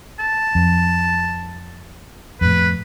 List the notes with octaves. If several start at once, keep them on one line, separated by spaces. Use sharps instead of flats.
A5
F2
F2 A2 B4